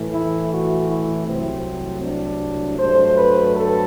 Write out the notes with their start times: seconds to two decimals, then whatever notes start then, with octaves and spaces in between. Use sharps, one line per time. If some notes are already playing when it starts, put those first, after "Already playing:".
Already playing: A2 E3 A3
0.13 E4
0.51 F#4
0.89 E4
1.27 C2 C3 F#3 A3 C4
2.02 D4
2.78 G2 F#3 A3 C5
3.17 B4
3.55 A4